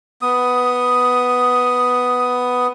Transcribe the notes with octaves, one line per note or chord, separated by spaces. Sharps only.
B3 D#6